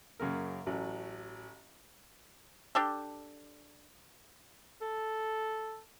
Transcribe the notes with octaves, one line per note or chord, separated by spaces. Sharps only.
F#2 C#3 A#3 A#4
A1 F#3
D4 G4 A4
A4